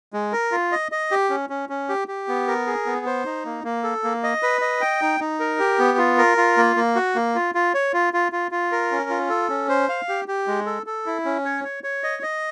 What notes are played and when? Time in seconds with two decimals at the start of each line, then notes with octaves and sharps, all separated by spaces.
0.13 G#3
0.33 A#4
0.52 F4
0.72 D#5
0.92 D#5
1.11 G4
1.30 C#4
1.50 C#4
1.69 C#4
1.89 G4
2.08 G4
2.28 B3
2.48 A#4
2.67 G#4
2.86 B3
3.06 C5
3.26 D#4
3.45 A#3
3.64 A#3
3.83 A4
4.04 A#3
4.23 D#5
4.43 B4
4.61 D#5
4.81 G5
5.01 D#4
5.20 D#4
5.40 A#4
5.59 G4
5.79 B3
5.98 F4
6.18 A#4
6.37 F4
6.57 A#3
6.76 A#3
6.95 F#4
7.15 A#3
7.35 F4
7.55 F4
7.74 C#5
7.93 F4
8.13 F4
8.32 F4
8.51 F4
8.72 A#4
8.92 C#4
9.10 F4
9.30 A4
9.49 C#4
9.69 C5
9.89 F5
10.09 G4
10.28 G4
10.47 G#3
10.66 A4
10.86 A4
11.06 E4
11.25 C#4
11.45 C#5
11.64 C#5
11.84 C#5
12.04 D#5
12.23 D#5